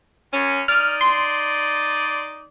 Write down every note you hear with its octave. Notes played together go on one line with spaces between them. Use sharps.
F#2 C#4
D#4 D5 F6
C6